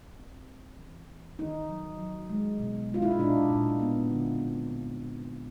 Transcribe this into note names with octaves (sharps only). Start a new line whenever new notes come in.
C4
G3
E3
E3
D#3 D#4
F#3
F#3
G#3
B2
G#3 F4
E4
D#4
A#2 D4
A#2
B3
D3
C4